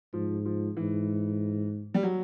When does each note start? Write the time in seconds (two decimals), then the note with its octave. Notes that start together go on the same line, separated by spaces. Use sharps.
0.13 G#2 F3
0.45 F3
0.76 G#2 E3
1.94 G3
2.03 F#3